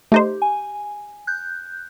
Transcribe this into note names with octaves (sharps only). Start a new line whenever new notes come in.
A3 D#4 G4 C5
G#5
F#6 G6